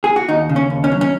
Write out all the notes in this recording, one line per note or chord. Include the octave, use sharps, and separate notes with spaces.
G#4
F#4
D#2 D#4
C#3
C#4
D#2
C#4
F#3
C#4